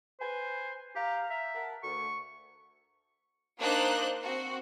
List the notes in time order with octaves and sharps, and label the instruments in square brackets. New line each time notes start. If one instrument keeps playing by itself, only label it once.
[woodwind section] B4 G#5 [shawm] C5
[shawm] G4 [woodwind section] F5 A#5
[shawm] E5
[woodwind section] A#4 F#5 A5
[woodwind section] D2 [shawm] C#6
[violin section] A#3 D4 D#4 C5 F#6
C4 F#4